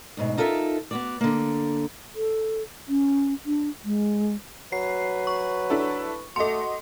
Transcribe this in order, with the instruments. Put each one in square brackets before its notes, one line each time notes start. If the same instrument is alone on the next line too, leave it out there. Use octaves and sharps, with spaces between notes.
[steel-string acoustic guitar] D2 G#2 B2
D#4 F4 A4 A#4 D#5 E5
B3 F#4 D5
D3 A#3
[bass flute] A4
C#4
D4
G#3
[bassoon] F#3 [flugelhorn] B4 [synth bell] C7
[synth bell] C#6
[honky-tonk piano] D4 E4 A4
[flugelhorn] A3 [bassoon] F#4 [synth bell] A4 C6 [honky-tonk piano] D#5 C#7